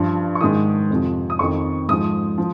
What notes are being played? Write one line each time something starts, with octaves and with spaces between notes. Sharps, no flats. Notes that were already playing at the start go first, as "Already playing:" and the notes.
Already playing: G2 F3
C#6
G#2 D#3 D#6
F2 C3 F3
D#6
F2 D#3 C#6
G#2 F3 D#6
F3